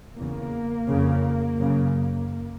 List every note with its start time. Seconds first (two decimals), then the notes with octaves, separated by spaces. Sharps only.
0.16 E2 C#3 A#3
0.88 F2 C#3
1.59 F#2 C#3